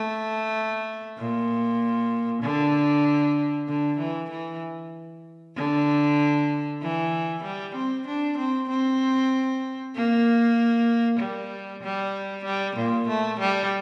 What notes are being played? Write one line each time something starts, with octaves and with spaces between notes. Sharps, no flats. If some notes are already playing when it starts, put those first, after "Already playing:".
Already playing: A3
A#2
D3
D3
E3
E3
D3
E3
G3
C4
D4
C4
C4
A#3
G3
G3
G3
A#2
A3
G3